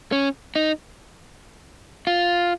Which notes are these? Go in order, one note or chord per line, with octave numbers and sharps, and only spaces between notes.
C#4
D#4
F4